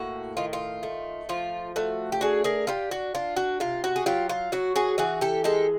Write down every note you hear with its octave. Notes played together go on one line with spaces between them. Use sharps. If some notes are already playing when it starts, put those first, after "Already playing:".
Already playing: A2 A#3 F#4
D#3 F4
F4
A3
F3 F4
A3 F#4
G4
D4 F#4 G#4
G#4 A#4
D4 F4 G4
F#4
D4 F4
F#4
C3 F4
F#4
G#4
F#3 F4 G4
F4
F#3 F#4
F#4 G#4
E3 F#4 G#4
G4 A4
G#3 G4 A4